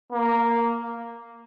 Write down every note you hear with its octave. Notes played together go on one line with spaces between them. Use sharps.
A#3